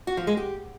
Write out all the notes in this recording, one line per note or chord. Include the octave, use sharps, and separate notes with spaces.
F#4
F3
G#3
G4